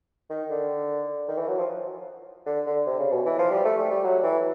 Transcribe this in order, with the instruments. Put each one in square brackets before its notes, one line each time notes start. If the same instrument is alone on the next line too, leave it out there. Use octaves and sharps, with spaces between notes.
[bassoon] D#3
D3
D#3
E3
F#3
F3
D3
D3
C3
C#3
B2
E3
F3
G3
A3
A3
G3
F#3
E3